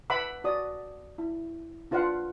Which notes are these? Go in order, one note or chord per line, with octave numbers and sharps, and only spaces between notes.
B4 E5 F#5 B5 D6 E6
F#4 D5 D#6
E4
D4 F4 B4 F5 F#5 C6